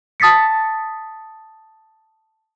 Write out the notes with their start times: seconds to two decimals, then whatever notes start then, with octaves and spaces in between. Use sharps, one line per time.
0.20 A5 D#6 A6 B6 C#7